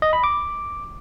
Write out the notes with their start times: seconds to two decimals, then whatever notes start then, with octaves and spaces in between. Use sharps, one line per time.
0.02 D#5
0.13 B5
0.24 D6